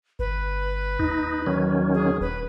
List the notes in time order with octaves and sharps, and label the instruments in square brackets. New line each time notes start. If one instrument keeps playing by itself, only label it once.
[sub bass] G1 [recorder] B4
[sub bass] D#2 [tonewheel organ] D#4
[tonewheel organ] D#3 F#3 C#4
[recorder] G#4
[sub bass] D#1 [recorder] B4